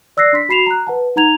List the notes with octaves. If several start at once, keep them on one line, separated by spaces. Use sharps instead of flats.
D5 E6 F#6 A#6 C7
D4 C6 B6
F#4 B5 C7 E7 F7
A#5 F#6
B4 F#5 A5
D#4 F#5 A#5 G#6 F7